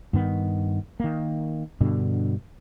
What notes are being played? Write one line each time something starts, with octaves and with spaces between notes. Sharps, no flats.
G2 D#3 B3
D#3 A#3
G2 B2 D3